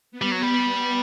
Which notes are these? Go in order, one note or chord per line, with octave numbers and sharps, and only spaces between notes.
B3
G3
F#3
G3